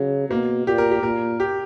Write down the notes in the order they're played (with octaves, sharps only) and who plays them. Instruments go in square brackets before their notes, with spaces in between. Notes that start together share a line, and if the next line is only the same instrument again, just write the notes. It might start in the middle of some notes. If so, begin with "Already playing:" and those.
Already playing: [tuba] C#3 [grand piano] F#3
[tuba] B2 [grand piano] A#3
[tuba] A#2 [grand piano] G4
[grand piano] A#4
G4
[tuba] A#2 [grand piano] A#4
[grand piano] G4